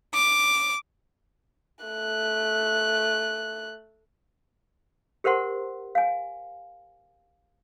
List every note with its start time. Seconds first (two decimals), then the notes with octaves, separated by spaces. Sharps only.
0.14 D6
1.85 A3 F#6
5.24 G4 A#4 C5 F#5 C6
5.95 F5 G#5